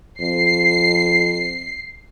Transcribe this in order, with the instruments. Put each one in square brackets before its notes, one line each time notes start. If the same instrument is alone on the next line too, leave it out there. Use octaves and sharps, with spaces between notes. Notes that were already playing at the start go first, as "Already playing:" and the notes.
[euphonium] F2 [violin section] C7